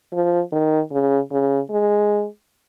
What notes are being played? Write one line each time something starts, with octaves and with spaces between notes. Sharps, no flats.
F3
D#3
C#3
C#3
G#3